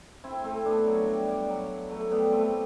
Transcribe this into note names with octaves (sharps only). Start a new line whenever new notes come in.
C4 E4
A3 C4
B3 D4
F#3
G3
G3
F#3
F#3 A3
G3 B3
A3 C4